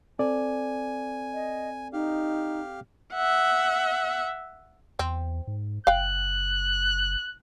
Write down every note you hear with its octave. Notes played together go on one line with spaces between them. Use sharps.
C4 A4 D5 G#5
D#5
D#4 G4 F5
E5 F#5
E2 C4
G#2
F#1 F5 G5 F#6